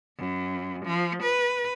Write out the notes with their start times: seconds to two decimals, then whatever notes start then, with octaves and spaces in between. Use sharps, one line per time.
0.18 F#2
0.85 F3
1.23 B4